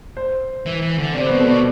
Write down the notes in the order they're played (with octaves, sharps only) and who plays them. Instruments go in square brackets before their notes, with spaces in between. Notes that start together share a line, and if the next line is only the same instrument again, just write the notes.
[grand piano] C5
[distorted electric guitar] E3
E3
D3
[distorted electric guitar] C3 [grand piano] D5
[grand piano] C5
[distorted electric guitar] B2 [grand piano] B4
[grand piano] A4
[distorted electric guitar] B2 [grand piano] D5